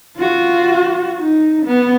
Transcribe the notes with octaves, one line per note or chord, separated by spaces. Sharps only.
F4 F#4
D#4
B3